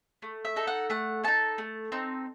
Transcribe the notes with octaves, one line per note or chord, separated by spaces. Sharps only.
A3
E5
D#4 A4
F#5
A3 F#5
D#4 A4 A5
A3
C4 D#4